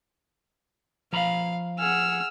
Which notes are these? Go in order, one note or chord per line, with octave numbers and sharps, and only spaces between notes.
F3 F5 A#5 B5
G#4 F#5 E6 F6